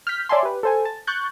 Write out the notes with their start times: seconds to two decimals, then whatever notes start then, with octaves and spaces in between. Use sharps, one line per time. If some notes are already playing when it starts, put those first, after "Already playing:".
0.07 F6 G6 B6
0.29 C#5 D5 E5 G#5 A5 C6
0.43 G4 B4
0.63 A4 C5 G#5
0.85 A5
1.07 C#6 F#6 G6 A6